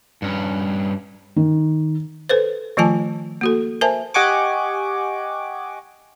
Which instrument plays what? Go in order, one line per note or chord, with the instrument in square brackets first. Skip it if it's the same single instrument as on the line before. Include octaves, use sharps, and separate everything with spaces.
[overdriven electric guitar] G2 C#4
[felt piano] D#3
[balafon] A4 B4 C5
D#3 F3 A3 F4 G#5 A5
A#3 F#4 A4
A#4 C5 E5 G#5 A5
[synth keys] G4 D#5 F#5 G#5 C#6 D6